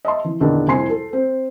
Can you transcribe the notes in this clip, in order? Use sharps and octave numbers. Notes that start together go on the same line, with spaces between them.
D#5 E5 A5 C6
E3
E2 A#2 D3 D#3 A#3 D4
C2 F2 E4 G#5 C6 C7
A4
C4